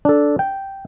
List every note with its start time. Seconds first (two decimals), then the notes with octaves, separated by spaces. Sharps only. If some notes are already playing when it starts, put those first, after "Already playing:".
0.05 D4 A4
0.39 G5